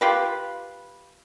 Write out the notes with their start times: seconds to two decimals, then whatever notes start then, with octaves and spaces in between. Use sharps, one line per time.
0.01 F4 G4 B4